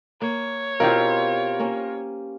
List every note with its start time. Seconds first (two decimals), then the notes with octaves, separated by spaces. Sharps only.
0.22 A#3 C#5
0.80 B2 C4 E4 F4 G4 A#4 C5 F5
1.59 A#3 C#4